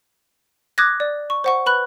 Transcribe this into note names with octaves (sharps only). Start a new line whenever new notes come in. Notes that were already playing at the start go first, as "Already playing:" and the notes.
D6 D#6 F#6 G#6 A#6
D5
C#6
C5 F#5 C#6
B4 B5 F#6